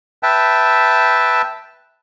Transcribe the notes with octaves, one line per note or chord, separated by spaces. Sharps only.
B4 E5 G5 A5